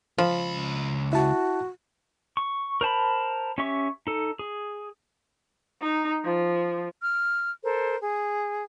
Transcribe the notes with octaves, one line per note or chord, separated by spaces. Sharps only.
C#2 F3 B5
E4 F#4 A5
C#6
A#4 C5 A5 B5
C#4 G4 E5 C#6
D#4 A4
G#4
D#4
F3
F6
A4 A#4 C5
G#4